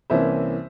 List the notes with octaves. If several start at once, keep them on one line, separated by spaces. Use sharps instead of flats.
C2 C3 E3 A#3 C#4 C5 E5